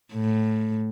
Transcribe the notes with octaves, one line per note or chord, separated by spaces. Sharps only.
A2